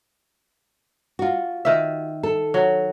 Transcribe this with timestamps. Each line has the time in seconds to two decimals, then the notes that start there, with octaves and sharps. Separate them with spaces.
1.19 F4 F#4
1.65 D#3 E5
2.23 A4
2.54 F#3